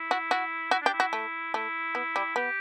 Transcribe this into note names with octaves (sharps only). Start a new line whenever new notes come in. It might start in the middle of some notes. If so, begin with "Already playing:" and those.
Already playing: E4
F#4
F#4
E4 F#4
D4 G4
E4
F#4
A3
A3 E4
B3
G3
B3 G4